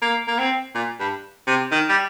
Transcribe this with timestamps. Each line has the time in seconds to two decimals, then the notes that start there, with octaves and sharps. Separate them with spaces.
0.02 A#3
0.28 A#3
0.39 C4
0.75 A#2
1.00 G2
1.47 C3
1.72 D#3
1.89 G3